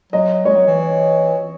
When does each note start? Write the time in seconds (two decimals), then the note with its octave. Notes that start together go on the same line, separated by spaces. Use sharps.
0.13 F#3 D#5
0.45 G#3 C#5
0.56 F#3
0.67 E3